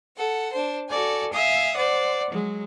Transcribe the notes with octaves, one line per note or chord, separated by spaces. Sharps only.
A4 F#5
D4 C5
F#4 A4 D5 G#5
E5 F5 G#5 D#6
C5 D5 F#5
F#3 G#3